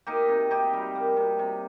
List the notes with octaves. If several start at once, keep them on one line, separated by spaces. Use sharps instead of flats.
A#3 D#4 G4
C3
C3 D#4 G4
G3
A#3
C3
C3